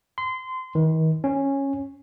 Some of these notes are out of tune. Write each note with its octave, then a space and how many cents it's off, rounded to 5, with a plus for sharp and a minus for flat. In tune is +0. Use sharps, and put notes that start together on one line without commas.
C6 -25
D#3 +40
C#4 -10